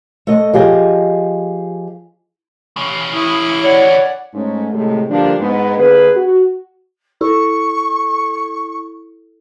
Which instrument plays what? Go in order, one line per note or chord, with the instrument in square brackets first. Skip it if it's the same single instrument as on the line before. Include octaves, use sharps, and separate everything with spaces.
[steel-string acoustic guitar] A3 D#5
F3 G4 G#4 D#5
[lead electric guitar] E3 C#4
[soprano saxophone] E4 [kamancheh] C#6 D#6
[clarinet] C#5 [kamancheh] D5 F#5
[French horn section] G#2 A3 C#4
A2 C3 G#3 A3
D3 F3 G3 A#3 D4
G#2 B3
D3 A#3 G#4 B4
F#4
[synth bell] E4 A4 [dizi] C#6